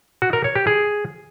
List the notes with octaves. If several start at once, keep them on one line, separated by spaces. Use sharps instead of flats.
F#4
A#4
C#5
G4
G#4